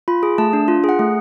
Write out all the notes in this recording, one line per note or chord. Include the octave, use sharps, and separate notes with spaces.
F4 B5
G#4
A3 A5
D4
F4
G#4 F#5
A3